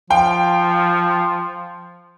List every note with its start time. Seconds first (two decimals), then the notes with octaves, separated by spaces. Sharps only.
0.10 F3 F5 G5